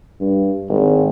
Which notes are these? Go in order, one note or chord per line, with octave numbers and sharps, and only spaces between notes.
G2
G#1